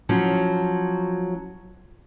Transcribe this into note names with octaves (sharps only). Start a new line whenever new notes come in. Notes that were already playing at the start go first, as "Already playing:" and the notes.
F3 F#3 C#4